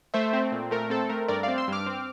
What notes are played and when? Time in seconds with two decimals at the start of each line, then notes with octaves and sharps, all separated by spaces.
0.14 A3 C5 E5
0.33 C4
0.52 A#2
0.71 A3 A#4
0.90 C4 A4
1.09 A3 A#4
1.28 G2 A#4 D5
1.43 C4 D5 F5
1.58 C6 E6
1.68 G2 D6 F6
1.86 C4